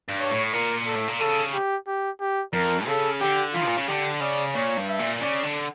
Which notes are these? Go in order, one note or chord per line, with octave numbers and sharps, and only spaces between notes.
G2
C#5
A2
A#2 A#4
A4
A2
A#2
C#3 A4
G4
G4
G4
F2 A#4
C#3 A4
D3 G4
E3 F4
A#2
C#3
D3 G4
C#3 D5
A#2 C#5
G2
E5
A#2
C#3 D5
D3